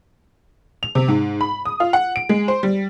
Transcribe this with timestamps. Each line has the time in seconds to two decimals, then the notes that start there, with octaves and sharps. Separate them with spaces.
0.83 F7
0.95 C3
1.08 G#2
1.41 B5
1.65 D#6
1.80 F4
1.93 F#5
2.16 D7
2.29 G#3
2.48 C5
2.63 G3